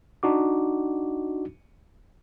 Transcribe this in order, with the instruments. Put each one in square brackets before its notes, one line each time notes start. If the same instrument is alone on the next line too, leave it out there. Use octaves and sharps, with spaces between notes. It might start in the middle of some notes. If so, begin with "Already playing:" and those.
[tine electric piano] D4 D#4 F#4 D6